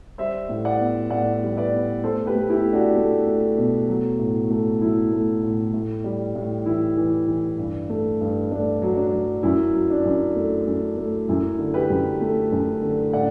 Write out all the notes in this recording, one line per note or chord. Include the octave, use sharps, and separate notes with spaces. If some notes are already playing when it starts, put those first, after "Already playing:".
G3 C5 E5
A2
D5 F#5
B3
A2 D5 F#5
G3
B4 D5
B3
A3 A4 C5
G4 B4
A3
E4 G4
A3
D4 F#4
A3
A3
B2
F#3
A2
A3
F#3 E4
A3
A2
A2
G3
A2
E3 E4
E3
E3
G2
A3
G2
A3 D4
F#3
D4
F#3
F#2 E4
F#3
D4
F#2
A3
F#2
A3
F#2 E4
D3
G4 B4
F#2
A3
F#2
D3
A2 D5 F#5